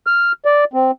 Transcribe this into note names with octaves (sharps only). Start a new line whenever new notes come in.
F6
D5
C4